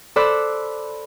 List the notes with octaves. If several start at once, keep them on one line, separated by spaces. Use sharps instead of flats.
A4 C5 D5 B5 E6 F#6